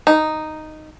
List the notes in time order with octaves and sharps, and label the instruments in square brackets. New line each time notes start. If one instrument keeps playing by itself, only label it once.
[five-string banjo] D#4